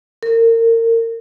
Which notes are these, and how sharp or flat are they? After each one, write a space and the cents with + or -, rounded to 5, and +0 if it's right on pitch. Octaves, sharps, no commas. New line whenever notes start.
A#4 -30